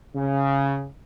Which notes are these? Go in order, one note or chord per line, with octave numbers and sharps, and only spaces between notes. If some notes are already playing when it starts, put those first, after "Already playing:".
C#3